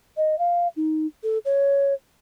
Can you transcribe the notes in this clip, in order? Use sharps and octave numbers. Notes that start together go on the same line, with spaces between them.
D#5
F5
D#4
A4
C#5